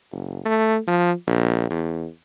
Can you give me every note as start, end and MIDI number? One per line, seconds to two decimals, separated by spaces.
0.12 0.40 30
0.45 0.78 57
0.87 1.12 53
1.27 1.70 34
1.70 2.07 40